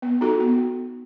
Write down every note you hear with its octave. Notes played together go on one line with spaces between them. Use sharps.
B3
D#4 F#4 A4
B3